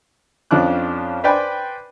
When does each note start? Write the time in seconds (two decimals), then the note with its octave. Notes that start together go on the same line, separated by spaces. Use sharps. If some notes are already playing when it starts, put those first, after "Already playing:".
0.51 F2 F3 C#4 D4 D6 F#6
1.24 B4 C5 D5 G5 G#5 B5